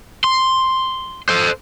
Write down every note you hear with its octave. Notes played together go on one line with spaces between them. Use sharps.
C6
A4 C5